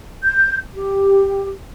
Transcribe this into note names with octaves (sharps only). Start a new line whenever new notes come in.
G6
G4